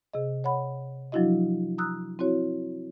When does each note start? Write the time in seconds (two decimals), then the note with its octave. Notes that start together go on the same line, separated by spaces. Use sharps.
0.14 C3 G#4 D#5
0.44 C#5 F#5 B5
1.12 F3 F#3 D4 E4 F#4 D#5
1.78 A#5 D#6 E6 F#6
2.19 C4 E4 F#4 C#5